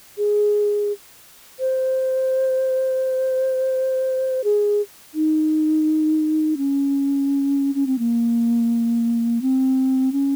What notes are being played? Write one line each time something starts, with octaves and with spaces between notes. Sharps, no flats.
G#4
C5
G#4
D#4
C#4
C#4
C4
A#3
C4
C#4